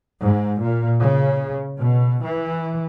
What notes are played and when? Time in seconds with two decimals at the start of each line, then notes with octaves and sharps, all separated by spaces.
0.23 G#2
0.63 A#2
1.01 C#3
1.78 B2
2.23 E3